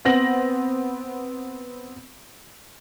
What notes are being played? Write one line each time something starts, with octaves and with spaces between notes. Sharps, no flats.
B3 C4 A#6 F#7